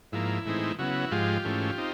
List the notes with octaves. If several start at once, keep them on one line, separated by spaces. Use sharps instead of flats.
G#2 F3 A#3 E4
A2 E3 G#3 C4 D#4
C#3 F#3 B3 E4 F#4
G#2 F3 G#3 F4 G4
G#2 E3 A3 C#4
C4 D#4